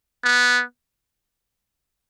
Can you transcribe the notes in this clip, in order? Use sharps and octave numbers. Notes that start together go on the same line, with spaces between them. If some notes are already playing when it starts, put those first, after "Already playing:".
B3